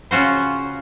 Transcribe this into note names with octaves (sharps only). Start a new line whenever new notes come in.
C#3 C#4 F4 F#4 C5